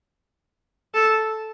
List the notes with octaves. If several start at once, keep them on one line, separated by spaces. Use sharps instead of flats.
A4